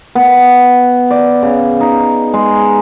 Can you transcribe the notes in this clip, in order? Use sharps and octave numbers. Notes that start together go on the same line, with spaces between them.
B3
D5
C#3
D#4
G#3